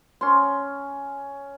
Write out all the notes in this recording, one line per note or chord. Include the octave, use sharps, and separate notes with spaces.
C#4 C6